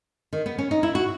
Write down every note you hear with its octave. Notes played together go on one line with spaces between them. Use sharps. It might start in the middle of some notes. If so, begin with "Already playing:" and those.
D#3
B3
C#4
D#4
E4
F#4